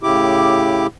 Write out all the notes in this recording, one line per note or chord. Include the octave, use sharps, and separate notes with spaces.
A2 C#3 E4 G4 D6